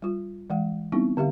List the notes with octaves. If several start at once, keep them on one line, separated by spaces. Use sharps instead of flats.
G3 F4
E3 G#3 F5
G3 B3 C4 D#4 E4
D3 G4 E5 F5